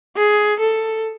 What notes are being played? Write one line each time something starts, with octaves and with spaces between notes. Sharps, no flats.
G#4
A4